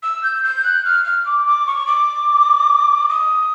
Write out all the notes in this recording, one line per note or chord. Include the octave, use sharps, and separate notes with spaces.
E6
G6
G6
F#6
F6
F6
D6
D6
C#6
D6
D#6